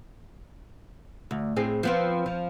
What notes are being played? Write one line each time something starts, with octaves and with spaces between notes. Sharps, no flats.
D2
A2 C4 G#4
F3 B3 C4
F3